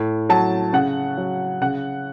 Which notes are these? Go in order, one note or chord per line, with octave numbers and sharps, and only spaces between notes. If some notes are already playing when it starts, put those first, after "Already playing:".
Already playing: A2
F#3 A5
C#3 F#5
F#3
C#3 F#5